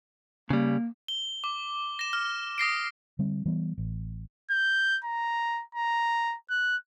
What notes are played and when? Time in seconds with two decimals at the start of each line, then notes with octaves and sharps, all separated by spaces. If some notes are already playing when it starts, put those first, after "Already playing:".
0.50 C#3 G3 A#3
1.08 G7
1.44 D6
1.99 A#6 E7
2.13 F6
2.58 D#6 A#6 C7 D7
3.19 D3 G3 C4
3.45 E3 G3 B3
3.78 A1
4.51 G6
5.04 A#5
5.75 A#5
6.50 F#6